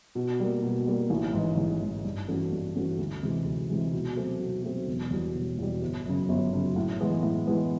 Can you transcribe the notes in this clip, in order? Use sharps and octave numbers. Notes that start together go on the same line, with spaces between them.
B2
G3 A#3
B2
G3 A#3
A1
G#2 E3
A1
G#2 E3
G2
E3 A3 C#4 F#4
G2
E3 A3 C#4 F#4
D2
C3 E3 G#3
D2
C3 E3 G#3
B2
F#3 A3 C4
B2
F#3 A3 C4
E1
E2 B2 G3
E1
E2 B2 G3
G1
F#2 C#3
G1
F#2 C#3
A2
E3 G#3 B3
A2
E3 G#3 B3